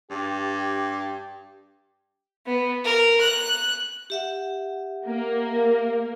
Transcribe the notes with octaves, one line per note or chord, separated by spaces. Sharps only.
G2 G4
B3
A#4
F#6
G4 E5 F#5
A#3